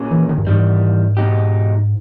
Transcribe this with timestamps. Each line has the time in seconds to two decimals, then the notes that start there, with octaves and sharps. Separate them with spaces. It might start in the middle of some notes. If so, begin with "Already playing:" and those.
Already playing: A#2 A#3 C#4 G#4
0.11 E3
0.29 D#3
0.38 G2
0.46 E2 G#2 D#3 G3
1.17 B2 G#3 D#4 G4